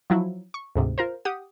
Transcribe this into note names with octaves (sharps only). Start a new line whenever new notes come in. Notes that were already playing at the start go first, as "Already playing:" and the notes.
F3 F#3 E4
C#6
D2 G#2 C3
F4 A#4 C5
G4 F#5 D#6